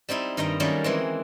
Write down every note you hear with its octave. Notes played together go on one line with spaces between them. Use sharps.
G3 C4 D#4 E4
G2 D#3 D#5 G5 A#5
D#3 F#3 G3 A3 A#3 C#4
E3 G#3 C4